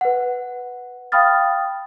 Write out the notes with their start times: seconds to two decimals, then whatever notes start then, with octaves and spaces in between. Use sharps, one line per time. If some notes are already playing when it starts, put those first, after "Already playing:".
0.01 B4 F#5
1.12 F5 G5 B5 D#6 F6 A6